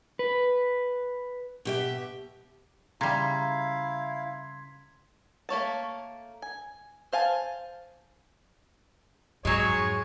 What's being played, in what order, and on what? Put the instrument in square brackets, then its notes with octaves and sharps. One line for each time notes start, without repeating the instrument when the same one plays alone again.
[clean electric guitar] B4
[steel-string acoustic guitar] B2 G4 E5
[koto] C#3 G3 [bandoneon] E4 F5 [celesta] A#5 [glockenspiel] C6 G#6 B6
[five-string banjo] A3 A#3 C#5 A5
G#5
C5 F5 G#5 A5
[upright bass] F2 G#2 [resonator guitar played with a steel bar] F#3 G#3 [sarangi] G#4 [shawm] C#5